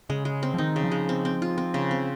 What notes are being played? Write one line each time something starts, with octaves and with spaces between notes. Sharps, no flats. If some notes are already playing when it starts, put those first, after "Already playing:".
C#3 G#3
G#3
C4
F3
D#3 D#4
C#3
F3
G#3
C4
C4
F4
C4
C#3
C4